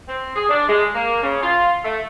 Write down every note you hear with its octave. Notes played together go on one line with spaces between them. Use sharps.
C4
G#4
D4
G#3
A#3
C#3
F4
A3